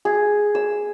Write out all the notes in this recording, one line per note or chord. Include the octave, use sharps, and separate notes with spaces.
G#4
E6